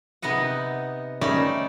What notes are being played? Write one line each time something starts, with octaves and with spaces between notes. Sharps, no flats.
C3 B3 D#4 D#5 F#5
G3 A3 C#4 D#4 D5 E5